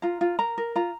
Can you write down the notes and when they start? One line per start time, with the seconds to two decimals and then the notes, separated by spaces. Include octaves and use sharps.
0.02 F4 A#5
0.21 F4
0.39 A#4 A#5
0.58 A#4
0.76 F4 A#5